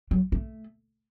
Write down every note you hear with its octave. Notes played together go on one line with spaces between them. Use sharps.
F#3
A3